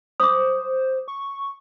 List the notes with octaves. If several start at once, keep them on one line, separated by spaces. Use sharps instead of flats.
C5 D6 D#6
C#6